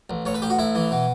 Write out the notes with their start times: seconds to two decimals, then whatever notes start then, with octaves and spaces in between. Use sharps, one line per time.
0.10 A1
0.26 A1 C#5
0.34 B4
0.42 A1 G4
0.50 F#4
0.59 A1 E4
0.75 E3
0.91 B2